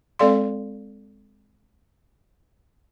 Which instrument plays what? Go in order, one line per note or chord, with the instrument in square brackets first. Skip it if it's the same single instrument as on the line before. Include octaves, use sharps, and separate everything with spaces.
[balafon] G#3 C4 A4 D5 F5 C6